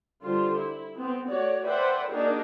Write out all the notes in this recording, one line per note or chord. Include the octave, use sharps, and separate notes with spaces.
D3 G3 F4 C5
E4
B3 C4
A3 F#4 C#5 D5
B4 C5 D5 E5 F#5 G5
A#3 D4 D#4 F#4 G#4 A#4